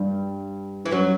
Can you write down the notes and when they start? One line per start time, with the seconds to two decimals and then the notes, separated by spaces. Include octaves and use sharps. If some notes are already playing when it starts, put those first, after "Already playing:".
Already playing: G2 G3
0.85 E3
0.91 F#2 F#3